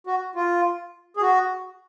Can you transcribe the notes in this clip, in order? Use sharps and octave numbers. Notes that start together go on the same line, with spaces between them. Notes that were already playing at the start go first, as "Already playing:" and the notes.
F#4
F4
G#4
F#4